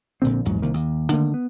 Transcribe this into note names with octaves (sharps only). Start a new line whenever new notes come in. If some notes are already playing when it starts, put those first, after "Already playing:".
A#1 A#2 D3 C4
A#1 E2 G#2 F#3
C2 D#3 A#3
D#2
D3 D#3 A3 A#3
B3